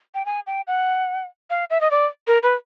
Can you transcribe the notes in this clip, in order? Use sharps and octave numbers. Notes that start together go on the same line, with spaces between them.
G5
G#5
G5
F#5
F5
E5
D#5
D5
A#4
B4